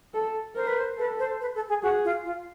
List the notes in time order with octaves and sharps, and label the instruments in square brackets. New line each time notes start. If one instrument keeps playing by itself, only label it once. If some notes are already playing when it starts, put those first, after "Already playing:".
[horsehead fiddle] A4
[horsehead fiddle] A#4 [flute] C5
[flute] B4
C5
[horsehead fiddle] A4 [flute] B4
[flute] C5
B4
A4
G#4
[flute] F#4 [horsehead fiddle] G#4
[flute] F4
F4